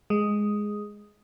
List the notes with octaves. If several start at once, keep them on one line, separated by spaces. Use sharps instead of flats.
G#3